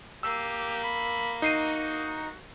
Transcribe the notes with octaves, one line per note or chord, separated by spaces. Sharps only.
A#3 G4 E6
B5
D#4 F#4 C7 D#7